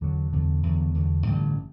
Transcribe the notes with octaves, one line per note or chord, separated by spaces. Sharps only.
E2 D3 F#3
E2 D3 F#3
E2 D3 F#3
E2 D3 F#3
A1 G2 D3 G3